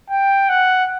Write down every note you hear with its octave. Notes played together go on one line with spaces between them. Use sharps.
G5
F#5